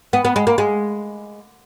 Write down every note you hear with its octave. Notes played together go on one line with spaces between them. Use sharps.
B3
B3
G#3
A#3
G#3